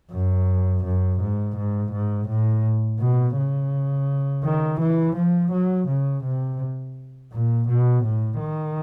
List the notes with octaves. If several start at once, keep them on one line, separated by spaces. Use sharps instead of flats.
F#2
F#2
G#2
G#2
G#2
A2
B2
C#3
D#3
E3
F3
F#3
C#3
C3
A#2
B2
A2
D#3